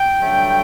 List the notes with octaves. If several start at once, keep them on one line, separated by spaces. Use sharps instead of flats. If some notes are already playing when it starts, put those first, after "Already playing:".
Already playing: G5
G2 D3 F#3 A3